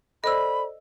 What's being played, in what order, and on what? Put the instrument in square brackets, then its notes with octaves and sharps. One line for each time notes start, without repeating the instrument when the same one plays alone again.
[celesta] A4 C5 D5 [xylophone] D#5 E6 [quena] B5